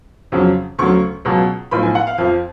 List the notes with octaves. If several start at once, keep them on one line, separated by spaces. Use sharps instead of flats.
F2 C#3 F#3
D2 C#3 F#3 C#6
C#2 B2 F#3
B1 A2 F3 B5
G#5
F#5
F5
F2 F3 F5